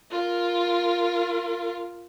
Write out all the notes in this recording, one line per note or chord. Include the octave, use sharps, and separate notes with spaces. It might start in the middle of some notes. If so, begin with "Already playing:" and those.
F4 A#4